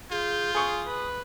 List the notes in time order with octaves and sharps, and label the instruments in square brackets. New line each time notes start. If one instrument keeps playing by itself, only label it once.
[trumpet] F4 [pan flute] G#4 [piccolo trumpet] G6
[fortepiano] G#4 C#6 [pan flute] D#6
[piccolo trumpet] B4